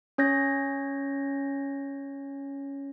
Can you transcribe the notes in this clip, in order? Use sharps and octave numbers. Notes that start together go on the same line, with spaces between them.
C#4 C#5 G6 A#6